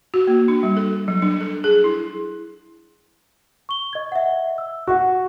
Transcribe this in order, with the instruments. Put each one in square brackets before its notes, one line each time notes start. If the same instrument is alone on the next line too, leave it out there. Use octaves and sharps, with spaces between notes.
[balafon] F#4
A#3
D4
G3
A4
F#3
D4
A4
G#4
E4
[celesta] C#6 G7
D#5 G#6
E5 F#5
E6
[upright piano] F#4 [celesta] F#5 C#6